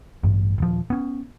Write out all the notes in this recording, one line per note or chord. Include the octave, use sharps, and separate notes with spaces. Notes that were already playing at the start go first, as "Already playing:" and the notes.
A1 G2
D#1 F3
B3 C#4